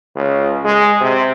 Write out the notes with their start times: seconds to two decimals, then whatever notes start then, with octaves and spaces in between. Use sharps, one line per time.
0.15 C#2
0.65 G#3
1.01 C3